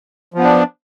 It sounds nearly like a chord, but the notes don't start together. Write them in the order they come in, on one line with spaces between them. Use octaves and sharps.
F3 B3 D4